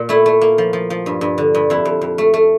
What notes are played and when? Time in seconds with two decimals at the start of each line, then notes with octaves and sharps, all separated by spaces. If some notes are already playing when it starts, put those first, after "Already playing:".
Already playing: A#2
0.09 A3 E4
0.26 A3
0.41 A#3
0.58 F3
0.73 F3
0.90 F3
1.06 G2
1.21 G2
1.38 D3
1.55 G2
1.70 F2 E4
1.85 F2
2.01 F2
2.18 A3
2.34 A3